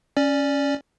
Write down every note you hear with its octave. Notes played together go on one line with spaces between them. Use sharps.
C#4 D5